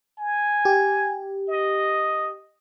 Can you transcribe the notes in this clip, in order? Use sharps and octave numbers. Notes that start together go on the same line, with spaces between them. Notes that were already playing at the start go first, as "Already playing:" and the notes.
G#5
G4
D#5